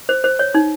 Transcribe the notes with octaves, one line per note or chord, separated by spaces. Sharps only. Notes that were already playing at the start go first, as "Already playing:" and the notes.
C5
C5
C#5
D#4